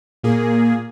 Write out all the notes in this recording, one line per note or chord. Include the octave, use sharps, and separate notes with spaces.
A#2 A#3 G#4